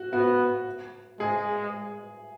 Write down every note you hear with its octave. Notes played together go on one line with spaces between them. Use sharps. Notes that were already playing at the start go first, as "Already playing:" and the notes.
Already playing: F#4
B3 F#4
G#3 G#4